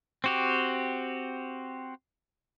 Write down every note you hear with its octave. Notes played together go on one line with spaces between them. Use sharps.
C4 F#4 G4